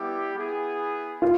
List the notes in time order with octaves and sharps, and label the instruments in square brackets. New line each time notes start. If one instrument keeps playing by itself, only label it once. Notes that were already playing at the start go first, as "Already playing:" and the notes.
Already playing: [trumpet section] G3 B3 E4 G4
B3 E4 G#4
[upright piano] F4